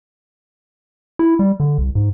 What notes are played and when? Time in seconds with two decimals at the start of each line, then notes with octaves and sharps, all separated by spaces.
1.19 E4
1.39 G3
1.60 D3
1.78 C2
1.95 G#2